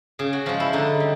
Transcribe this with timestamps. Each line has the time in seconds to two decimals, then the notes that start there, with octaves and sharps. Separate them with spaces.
0.19 C#3 G#4
0.33 F#4
0.46 F3 G#3 F4
0.60 E4
0.73 D3 D#4
1.00 G3